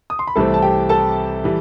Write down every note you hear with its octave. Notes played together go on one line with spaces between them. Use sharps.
D#6
C6
B5
C2 C3 E3 A3 C4 A4 A5
A5
G4 G5
A4 A5
E3 G3